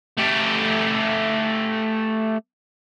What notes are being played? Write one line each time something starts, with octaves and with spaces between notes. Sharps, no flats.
A3 G4